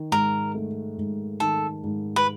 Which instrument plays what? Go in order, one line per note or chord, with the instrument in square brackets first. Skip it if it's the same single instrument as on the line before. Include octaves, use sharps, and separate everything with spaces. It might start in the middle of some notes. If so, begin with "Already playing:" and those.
Already playing: [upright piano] D#3
[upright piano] G#2 [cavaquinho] A#4
[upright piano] A3
G#2
[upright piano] D#3 [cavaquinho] A4
[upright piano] G#2
[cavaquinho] B4